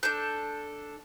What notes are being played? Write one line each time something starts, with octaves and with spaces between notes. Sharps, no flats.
D4 A4 G6